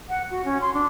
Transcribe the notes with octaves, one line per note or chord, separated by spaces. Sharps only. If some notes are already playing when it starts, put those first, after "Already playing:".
F#5
F#4
C#4
C6
D4